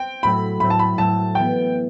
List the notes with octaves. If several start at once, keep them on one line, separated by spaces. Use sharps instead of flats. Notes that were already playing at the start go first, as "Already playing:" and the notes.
Already playing: C4 G5
A2 F#3 A3 C4 B5
A2 F#3 A3 C4 B5
A5
B5
A2 F#3 A3 C4 A5
E3 B3 G5